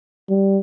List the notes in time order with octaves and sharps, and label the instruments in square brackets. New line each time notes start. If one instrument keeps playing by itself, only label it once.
[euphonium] G3